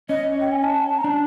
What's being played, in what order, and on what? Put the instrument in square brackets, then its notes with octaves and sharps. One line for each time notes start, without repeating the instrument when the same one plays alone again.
[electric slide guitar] C#4 [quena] D#5
[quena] G5
G#5
A5
A#5
[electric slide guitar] D4 [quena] A5